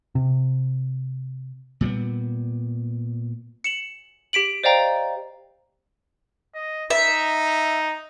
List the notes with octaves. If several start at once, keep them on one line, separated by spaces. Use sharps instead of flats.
C3
A#2 G3 G#3 B3
C#7 E7 F#7
G4 B6 D7 F#7
C5 D5 D#5 F5 G5 A#5
D#5
D#4 E5